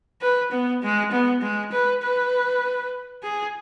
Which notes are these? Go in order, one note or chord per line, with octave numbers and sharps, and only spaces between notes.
B4
B3
G#3
B3
G#3
B4
B4
G#4